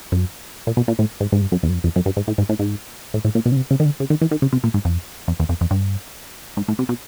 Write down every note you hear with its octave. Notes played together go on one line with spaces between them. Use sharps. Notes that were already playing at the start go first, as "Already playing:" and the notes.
F#2
A#2
B2
A#2
A2
G#2
G#2
G2
F#2
E2
F#2
F2
F2
F#2
G2
G#2
A2
G#2
A2
G#2
A2
A2
A#2
B2
C#3
C3
C#3
D#3
D3
C#3
D#3
E3
D#3
C#3
C3
A#2
G#2
F2
F2
E2
F2
F2
G2
G#2
A2
C3
B2